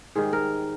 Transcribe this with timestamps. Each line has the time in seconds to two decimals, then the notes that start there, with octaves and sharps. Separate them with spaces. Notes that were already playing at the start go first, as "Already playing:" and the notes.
0.15 G#2 D#3 G3 G#4
0.33 A#4